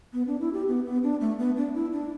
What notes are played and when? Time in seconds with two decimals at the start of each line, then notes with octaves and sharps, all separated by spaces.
0.13 B3
0.27 D4
0.40 E4
0.53 G4
0.68 B3
0.86 B3
1.03 D4
1.21 A3
1.39 B3
1.56 D4
1.74 E4
1.92 D4